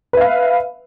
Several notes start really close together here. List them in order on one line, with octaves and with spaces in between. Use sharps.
B4 E5 F5